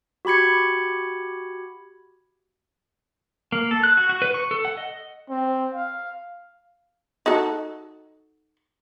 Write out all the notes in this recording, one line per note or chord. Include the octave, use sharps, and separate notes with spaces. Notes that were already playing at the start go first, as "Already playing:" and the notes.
F#4 G4 B5 G#6 C#7
A#3
A4
F#6
F#4
F#4
B4
C#6
A4
F#5
D#5
C4
F5
D#4 F#4 A4